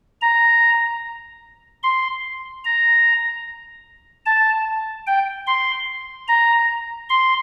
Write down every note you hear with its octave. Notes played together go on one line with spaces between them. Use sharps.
A#5
C6
A#5
A5
G5
C6
A#5
C6